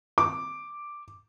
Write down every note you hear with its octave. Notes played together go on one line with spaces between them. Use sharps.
D6